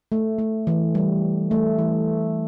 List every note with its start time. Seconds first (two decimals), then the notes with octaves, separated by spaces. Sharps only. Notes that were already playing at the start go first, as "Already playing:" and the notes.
0.12 A3
0.39 A3
0.67 E3
0.95 G3
1.51 A3
1.78 E3